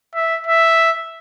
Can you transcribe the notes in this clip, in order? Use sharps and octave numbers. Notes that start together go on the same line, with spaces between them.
E5
E5